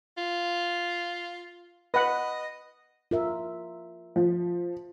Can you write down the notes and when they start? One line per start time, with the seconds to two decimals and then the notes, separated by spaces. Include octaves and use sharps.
0.17 F4
1.94 B4 D#5 F#5
3.11 F4 A#4 E5
4.16 F3